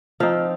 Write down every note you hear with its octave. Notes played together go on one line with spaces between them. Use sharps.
F3 C4 D#4 F5